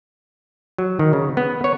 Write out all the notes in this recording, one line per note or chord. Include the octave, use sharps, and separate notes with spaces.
F#3
D#3
C#3
B3
C#5